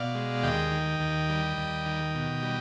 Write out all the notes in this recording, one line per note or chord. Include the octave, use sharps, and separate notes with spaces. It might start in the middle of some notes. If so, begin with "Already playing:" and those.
Already playing: B2 D5 F5
G#3
D#2 D#5 G5
D#3
D#2
G3
D#2
D#3
B2
G3